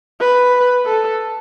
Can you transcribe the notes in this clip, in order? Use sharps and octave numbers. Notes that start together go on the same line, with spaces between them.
B4
A4